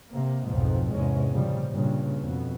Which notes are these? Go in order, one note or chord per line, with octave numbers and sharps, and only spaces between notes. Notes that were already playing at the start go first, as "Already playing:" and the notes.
C3 A#3
B1 F2 G#2 F3
E2 G#2 C3 G#3 C#4
A#2 C#3 F3 G3
G2 A#2 C#3
F2 B2